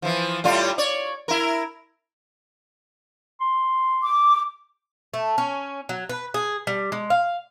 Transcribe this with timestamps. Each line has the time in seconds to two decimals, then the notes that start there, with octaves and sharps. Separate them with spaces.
0.02 E3 F3
0.44 A2 G3 F4
0.78 C#5 D5
1.28 E4 A#4
3.41 C6
4.04 D6
5.14 A3
5.38 C#4
5.89 F#3
6.09 B4
6.34 G#4
6.67 G3
6.92 G#3
7.10 F5